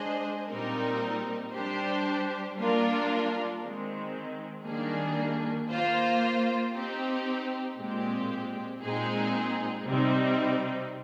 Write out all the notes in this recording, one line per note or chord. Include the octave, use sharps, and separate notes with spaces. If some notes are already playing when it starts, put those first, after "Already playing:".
Already playing: G#3 D4 G#4 C5 D#5
A#2 G3 C4 D#4 A#4
G3 D4 G4 C5
G3 A#3 D4 F4 A#4
D#3 G#3 C4
D#3 G3 A#3 D4 G#4
A#3 F4 C5
C4 D#4 G4
A#2 G#3 C4 G4
A#2 G#3 C4 D#4 G#4
C3 G3 C4 D#4